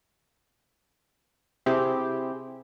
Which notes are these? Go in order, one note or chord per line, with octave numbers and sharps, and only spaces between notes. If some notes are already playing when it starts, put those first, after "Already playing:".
C3 C4 E4 G4 G#4